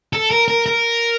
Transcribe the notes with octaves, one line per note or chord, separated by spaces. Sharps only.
A4
A#4
A#4
A#4